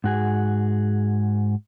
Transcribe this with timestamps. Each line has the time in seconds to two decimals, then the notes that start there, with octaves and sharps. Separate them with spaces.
0.04 G#2 F#4 G#4